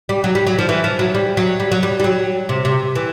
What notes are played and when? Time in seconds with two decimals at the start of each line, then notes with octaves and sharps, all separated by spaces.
0.09 G3
0.24 F#3
0.35 G3
0.47 F#3
0.59 F3
0.69 E3
0.84 F3
0.99 F#3
1.15 G3
1.37 F#3
1.60 G3
1.72 F#3
1.83 G3
2.00 G3
2.04 F#3
2.49 C3
2.65 C3
2.95 E3